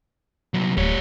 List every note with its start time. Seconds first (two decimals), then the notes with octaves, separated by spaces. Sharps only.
0.54 C2 F#3
0.77 D1 G3 C#5